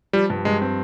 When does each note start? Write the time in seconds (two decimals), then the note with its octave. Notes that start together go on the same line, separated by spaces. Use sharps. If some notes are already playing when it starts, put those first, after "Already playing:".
0.13 F3 G3
0.30 G2
0.45 G2 G#3
0.62 C4